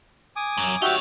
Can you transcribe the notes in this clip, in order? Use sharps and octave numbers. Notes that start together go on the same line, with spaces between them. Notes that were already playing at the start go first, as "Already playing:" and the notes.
G#5 D6 D#6
F#2
D#4 F#4 G4 C#5 E5